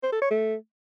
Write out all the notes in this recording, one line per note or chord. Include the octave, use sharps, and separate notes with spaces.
C5
A4
C#5
A3